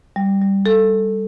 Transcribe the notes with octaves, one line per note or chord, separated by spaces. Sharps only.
G3
G3
A4